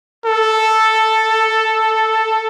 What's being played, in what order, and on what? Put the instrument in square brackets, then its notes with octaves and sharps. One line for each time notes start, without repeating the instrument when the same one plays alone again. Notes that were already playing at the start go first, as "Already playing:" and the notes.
[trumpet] A4